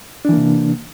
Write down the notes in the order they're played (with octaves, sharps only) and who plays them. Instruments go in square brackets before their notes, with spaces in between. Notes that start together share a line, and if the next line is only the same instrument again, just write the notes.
[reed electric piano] D4
E3
A#3
C3